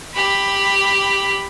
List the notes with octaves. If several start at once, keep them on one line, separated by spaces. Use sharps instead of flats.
G4 B5